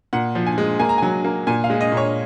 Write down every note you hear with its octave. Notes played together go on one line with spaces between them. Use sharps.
A#2 F#5
F3
G#5
G#3
A#3 G#5
A#5
F#3 G#5
A#3
A#2 G#5
F5
G#3
D#5
A#2
C#5